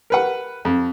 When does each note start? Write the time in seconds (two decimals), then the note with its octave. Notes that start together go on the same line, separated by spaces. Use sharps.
0.10 A#4 B4 F#5
0.65 F2